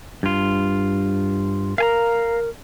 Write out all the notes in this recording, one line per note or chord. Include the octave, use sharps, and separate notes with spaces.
G2 F4
A#4 F5 G#5 A#5